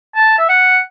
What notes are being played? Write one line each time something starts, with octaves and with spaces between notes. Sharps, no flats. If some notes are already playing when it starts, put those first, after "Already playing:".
A5
E5
F#5